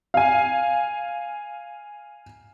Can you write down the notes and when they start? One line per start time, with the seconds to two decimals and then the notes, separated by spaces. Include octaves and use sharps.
0.14 F5 G#5